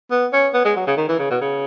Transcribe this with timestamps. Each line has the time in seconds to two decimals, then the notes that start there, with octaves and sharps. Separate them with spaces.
0.11 B3
0.33 C#4
0.54 B3
0.65 G#3
0.76 F#3
0.87 C#3
0.97 D#3
1.09 E3
1.19 C#3
1.31 B2
1.41 C#3